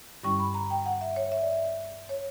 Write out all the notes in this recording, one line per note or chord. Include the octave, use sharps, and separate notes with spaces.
G2 D3 G3 C#4 E4 C#6
B5
A#5
G5
F#5
E5
C#5
E5
D5
E5
C#5